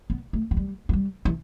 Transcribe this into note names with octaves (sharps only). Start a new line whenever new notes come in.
B3
A3
F#3
G3
F#3
G3
E3